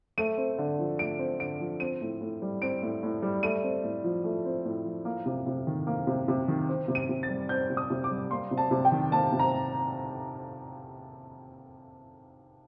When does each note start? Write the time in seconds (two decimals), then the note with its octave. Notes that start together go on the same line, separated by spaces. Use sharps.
0.18 A3 D#7
0.37 C4
0.58 D3
0.79 F3
0.99 A3 D7
1.19 C4
1.40 D3 D7
1.60 F3
1.80 C4 D#7
2.01 A2
2.21 A2
2.42 G3
2.62 C4 D7
2.82 A2
3.03 A2
3.22 G3
3.43 A3 D#7
3.63 C4
3.83 A2
4.04 F3
4.24 A3
4.45 C4
4.65 A2
4.85 F3
5.05 A#3
5.26 C3
5.46 C3
5.67 D#3
5.87 A#3
6.07 C3
6.28 C3
6.48 D#3
6.69 C4
6.88 C3
6.95 D#7
7.09 C3
7.23 A6
7.29 G3
7.49 C4 G6
7.70 C3
7.77 D#6
7.90 C3
8.04 D6
8.11 G3
8.31 A#3 C6
8.51 C3
8.58 A5
8.71 C3
8.85 G5
8.92 D#3
9.12 A#3 A5
9.32 C3
9.39 A#5